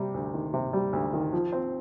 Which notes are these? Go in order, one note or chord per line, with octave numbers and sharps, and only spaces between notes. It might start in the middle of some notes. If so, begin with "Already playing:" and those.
Already playing: C3 G3
D2
D#3
C3
G3
D2
D#3
F3
C4